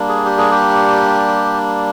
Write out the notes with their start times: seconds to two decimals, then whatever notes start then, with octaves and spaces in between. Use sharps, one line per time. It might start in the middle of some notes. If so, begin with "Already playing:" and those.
Already playing: G3 A#3 D4
0.08 G#4
0.25 G4
0.38 G#4
0.51 G4